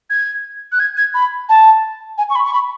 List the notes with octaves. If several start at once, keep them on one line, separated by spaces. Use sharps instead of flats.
G#6
F#6
G#6
G#6
B5
A5
G#5
C#6
B5
C#6
B5